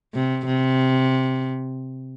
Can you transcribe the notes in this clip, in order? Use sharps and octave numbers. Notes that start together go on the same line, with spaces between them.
C3
C3